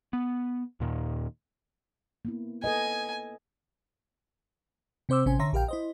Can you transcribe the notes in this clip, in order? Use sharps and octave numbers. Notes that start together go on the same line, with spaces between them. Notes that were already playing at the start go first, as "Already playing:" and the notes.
B3
D#2 A#2 D#3
A#3 B3 E4
A4 B4 D#5 G#5
C3 C4 C5 D6 E6
A1 C3 C#4 C5 G#5
D3 C#5 E5 A#5 C6 A#6
A#1 G4 A#4 F5 G5
E4 C5 D#5